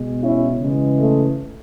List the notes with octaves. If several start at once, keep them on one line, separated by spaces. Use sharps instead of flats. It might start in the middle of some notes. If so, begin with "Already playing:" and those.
Already playing: B2 G#3
C#4 E4
C#3 E3 G#3
A3